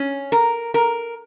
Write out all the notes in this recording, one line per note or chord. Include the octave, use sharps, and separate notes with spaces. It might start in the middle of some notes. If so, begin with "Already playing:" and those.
Already playing: C#4
A#4
A#4